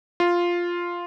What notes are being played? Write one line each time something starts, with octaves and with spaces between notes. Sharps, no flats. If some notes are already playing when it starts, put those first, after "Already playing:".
F4